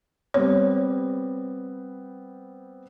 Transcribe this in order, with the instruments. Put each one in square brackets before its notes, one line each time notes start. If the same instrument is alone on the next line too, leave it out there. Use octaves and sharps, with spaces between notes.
[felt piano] G3 B3 C4 [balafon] C#5